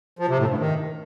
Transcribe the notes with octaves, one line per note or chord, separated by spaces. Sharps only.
F3
C3
A2
G2
D#3